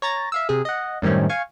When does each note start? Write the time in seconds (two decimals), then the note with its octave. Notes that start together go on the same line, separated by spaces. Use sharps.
0.02 C#5 A#5 A6 A#6
0.32 E5 F5 E6
0.49 C3 G#4
0.65 D#5 F#5
1.02 F#2 A2 D#3 G3 C4 C#4
1.29 F5 G#5 C#6